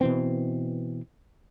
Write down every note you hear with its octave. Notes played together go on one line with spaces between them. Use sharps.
B2 E3 C4